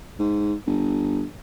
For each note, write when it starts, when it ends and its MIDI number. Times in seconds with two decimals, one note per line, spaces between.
0.19 0.54 44
0.67 1.25 31